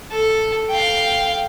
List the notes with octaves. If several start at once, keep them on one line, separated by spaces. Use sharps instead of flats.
A4
F5 G5